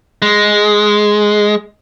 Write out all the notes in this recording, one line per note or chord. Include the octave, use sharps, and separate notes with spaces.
G#3